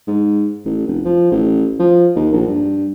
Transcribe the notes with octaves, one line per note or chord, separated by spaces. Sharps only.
G#2
A1
F1
F3
A1
F3
D#2
A#1
G2